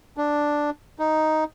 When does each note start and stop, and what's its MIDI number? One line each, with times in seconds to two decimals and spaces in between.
0.17 0.70 62
0.99 1.44 63